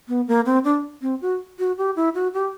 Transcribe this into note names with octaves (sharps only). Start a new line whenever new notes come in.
B3
A#3
C4
D4
C4
F#4
F#4
G4
E4
F#4
G4